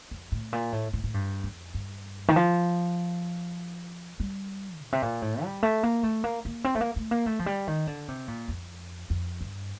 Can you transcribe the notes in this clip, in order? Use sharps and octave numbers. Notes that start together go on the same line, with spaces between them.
F2
A2
A#2
A2
A2
A2
G2
F2
G2
D#3
F3
G3
A#2
C3
A#2
A2
G3
A3
A#3
A3
A#3
A#3
C4
A3
A#3
A3
A#3
A3
F3
G3
D#3
D3
C3
A#2
F2
F2
G2